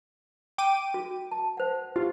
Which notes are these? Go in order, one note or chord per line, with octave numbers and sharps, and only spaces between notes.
G5 D6 D#7
F#4
A5
C5 F#5
F4 G4